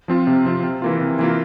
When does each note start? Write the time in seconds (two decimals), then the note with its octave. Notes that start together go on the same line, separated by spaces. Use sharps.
0.08 F3 C4 F4
0.27 C3
0.45 F3 C4 F4
0.63 C3
0.82 E3 A#3 F4
1.00 C3
1.19 E3 A#3 F4